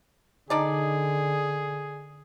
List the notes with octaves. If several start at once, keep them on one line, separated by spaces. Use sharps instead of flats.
D3 D4 D#4 G#4 D5